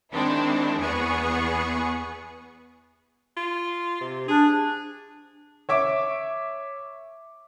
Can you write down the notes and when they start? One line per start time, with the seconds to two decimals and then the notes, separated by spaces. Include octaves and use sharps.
0.13 D#3 G#3 C4 D4 E4
0.80 E2 B3 G#4 C#6
3.37 F4
4.01 C3
4.28 D4 G#4
5.69 C#5 E5 D6